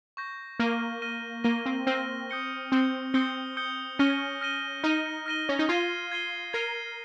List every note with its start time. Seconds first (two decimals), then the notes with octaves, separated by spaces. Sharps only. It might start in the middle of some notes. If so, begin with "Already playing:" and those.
0.17 C#6 G6 A#6
0.59 A#3 F6 A#6 D#7 G7
1.02 F6 A#6 D#7 G7
1.44 A#3 F6 A#6 D#7 G7
1.66 C4
1.87 C4 F6 A#6 D#7 G7
2.30 D#6 G6 C#7 G7
2.72 C4 D#6 G6 C#7 G7
3.14 C4 D#6 G6 C#7 G7
3.57 D#6 G6 C#7 G7
3.99 C#4 F6 A#6 D#7 G7
4.41 F6 A#6 D#7 G7
4.83 D#4 F6 A#6 D#7 G7
5.26 F6 A#6 D#7 G7
5.49 C#4
5.59 D#4
5.69 F4 G#6 C7 D#7 G7
6.11 G#6 C7 D#7 G7
6.53 A#4 G#6 C7 D#7 G7